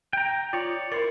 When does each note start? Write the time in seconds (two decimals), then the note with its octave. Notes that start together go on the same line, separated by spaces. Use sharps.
0.13 G5 A#5
0.53 F4 C#5 D5
0.92 E4 A#4 C5 D5